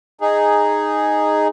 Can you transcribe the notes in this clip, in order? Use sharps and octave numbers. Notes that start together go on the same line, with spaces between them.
D#4 G#4